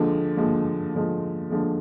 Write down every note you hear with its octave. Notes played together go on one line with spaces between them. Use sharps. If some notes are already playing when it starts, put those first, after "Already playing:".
Already playing: D#2 D3 F3 G#3
D#2 D3 F3 G#3
D#2 D3 F3 G#3
D#2 D3 F3 G#3